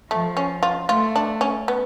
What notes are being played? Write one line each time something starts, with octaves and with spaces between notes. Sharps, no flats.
F3 A3
C#4
F4
A3 F4
D4
C#4
B3